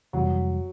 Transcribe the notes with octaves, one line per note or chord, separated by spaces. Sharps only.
F2 C3 E3 F#3 G3